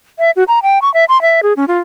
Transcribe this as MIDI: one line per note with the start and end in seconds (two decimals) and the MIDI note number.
0.19 0.31 76
0.36 0.43 66
0.48 0.59 82
0.63 0.79 79
0.82 0.92 85
0.94 1.05 76
1.09 1.21 84
1.22 1.40 76
1.43 1.53 68
1.56 1.65 61
1.68 1.78 65